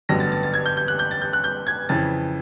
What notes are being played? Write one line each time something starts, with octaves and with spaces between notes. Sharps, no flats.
A1 G2 D3 F#3 B3 A#6
A6
A6
A6
G#6
G6
G6
F#6
G6
A6
G6
F#6
G6
G#6
F2 C#3 E3 A6